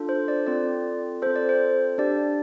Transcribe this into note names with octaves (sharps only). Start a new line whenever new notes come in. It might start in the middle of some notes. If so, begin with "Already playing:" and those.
Already playing: D4 F4 A4
C5
D5
C4 F4 A4 D5
C4 F4 A4 C5
D5
C5
D4 G4 D5